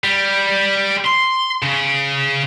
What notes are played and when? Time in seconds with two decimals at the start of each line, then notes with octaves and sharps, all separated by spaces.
0.04 G3
1.05 C6
1.62 C#3